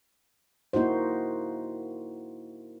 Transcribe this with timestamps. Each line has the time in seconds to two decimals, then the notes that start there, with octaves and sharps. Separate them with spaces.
0.73 A#3 D#4 E4 F#4 C5